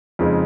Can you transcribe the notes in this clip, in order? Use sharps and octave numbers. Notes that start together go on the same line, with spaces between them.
F2 C#3 G#3 D#4